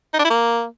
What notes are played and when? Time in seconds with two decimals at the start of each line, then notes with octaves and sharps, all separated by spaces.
0.13 D#4
0.19 D4
0.24 E4
0.30 A#3